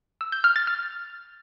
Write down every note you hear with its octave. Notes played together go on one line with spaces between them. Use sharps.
E6
G6
F6
A6
F6